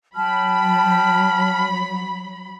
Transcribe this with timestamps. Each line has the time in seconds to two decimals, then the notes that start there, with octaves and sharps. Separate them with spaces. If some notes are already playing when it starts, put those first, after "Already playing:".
0.15 F#3 G5 A5 B5 F6